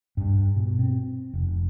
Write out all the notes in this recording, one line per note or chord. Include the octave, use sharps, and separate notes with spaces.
G2
B2
C4
F1